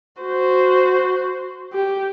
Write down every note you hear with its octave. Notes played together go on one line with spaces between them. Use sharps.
F#4 C5
G4